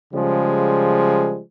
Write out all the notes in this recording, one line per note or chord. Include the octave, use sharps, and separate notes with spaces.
C#3 F3 G3 G#3